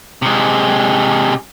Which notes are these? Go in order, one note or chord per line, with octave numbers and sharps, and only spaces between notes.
C3 G#3